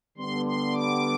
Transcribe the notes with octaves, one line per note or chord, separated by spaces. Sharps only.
D3 G3 B3 C6
C6
D6